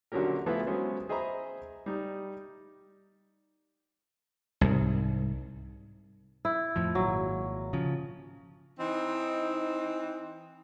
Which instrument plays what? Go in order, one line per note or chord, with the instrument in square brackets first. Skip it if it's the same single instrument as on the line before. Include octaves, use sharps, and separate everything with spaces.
[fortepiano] A#1 D3 F#3 C#4 G4 A#4
E3 F3 A3 B3 E4 F4
F#3 G#3 B3 C#4 C5
G#4 C5 D#5 E5 A#5 B5
G3 D#4
[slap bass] C2 G#2
[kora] E4
[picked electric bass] F2 A2 F3
[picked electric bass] G#1 A#2 [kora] F#3
[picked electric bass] C#3 F3
[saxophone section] E3 C4 D#4